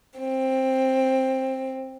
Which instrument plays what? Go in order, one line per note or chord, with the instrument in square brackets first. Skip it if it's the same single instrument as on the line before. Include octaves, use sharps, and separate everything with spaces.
[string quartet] C4